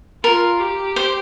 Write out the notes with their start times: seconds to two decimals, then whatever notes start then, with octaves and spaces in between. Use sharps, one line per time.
0.24 F4 A#4
0.60 G4
0.96 C5